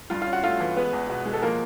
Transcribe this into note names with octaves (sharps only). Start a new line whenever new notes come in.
G2 F4 F5
C#4 F4 F5
F#4 F#5
A3 F4 F5
E3
G#3 B3 B4
E2
B2
G#3
A4
F3 A#3 A#4